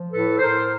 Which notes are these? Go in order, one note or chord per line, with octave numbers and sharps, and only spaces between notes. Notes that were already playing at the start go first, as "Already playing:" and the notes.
Already playing: F3
A2 A4 B4
A2 A#4 C5